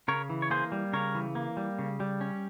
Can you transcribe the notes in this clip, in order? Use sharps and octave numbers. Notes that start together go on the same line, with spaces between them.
C#3 A#4 C#5
E3
C#5
A#3 G#4 C5
G3
C#3 A#4 C#5
E3
A#3
G3
C#3
G3
C#4